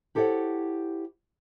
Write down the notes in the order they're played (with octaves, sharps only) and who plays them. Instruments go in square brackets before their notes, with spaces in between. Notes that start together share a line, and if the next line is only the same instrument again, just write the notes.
[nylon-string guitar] E4 G4 A4 C5 C#5 F#5